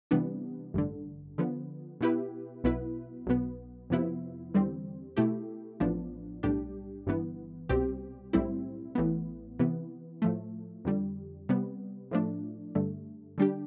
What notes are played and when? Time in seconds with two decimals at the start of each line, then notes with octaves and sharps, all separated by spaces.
0.11 C3 E3 G3 B3 D4
0.74 A1 G2 D3
1.38 D3 F3 B3
2.01 B2 B3 E4 G4 B4
2.64 B1 B2 B3 E4 B4
3.27 B1 B2 B3
3.90 F2 C3 F3 B3 E4
4.54 E2 D3 G3 C4
5.16 B2 A3 E4 G4
5.80 A1 A2 F3 B3 D4
6.43 B1 A2 G3 D4 G4
7.06 G1 G2 E3 B3
7.69 C2 B2 G3 C4 G4
8.33 B1 A2 G3 C4 E4
8.95 A1 A2 E3 B3
9.59 C3 E3 B3
10.22 A2 F3 A3
10.85 F2 D3 G3
11.49 C3 G3 B3
12.11 A2 F3 A3 D4
12.75 G2 D3 A3
13.38 D3 G3 D4 G4